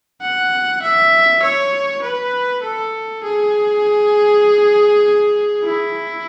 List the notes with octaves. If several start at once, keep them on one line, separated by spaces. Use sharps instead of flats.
F#5
E5
C#5
B4
A4
G#4
E4